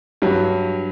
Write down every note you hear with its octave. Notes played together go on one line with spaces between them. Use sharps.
G2 F#3